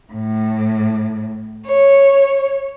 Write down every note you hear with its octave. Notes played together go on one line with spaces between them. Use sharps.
A2
C#5